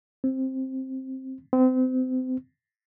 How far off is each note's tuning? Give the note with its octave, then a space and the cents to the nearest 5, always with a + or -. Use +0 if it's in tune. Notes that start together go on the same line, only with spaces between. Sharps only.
C4 +10
C4 -30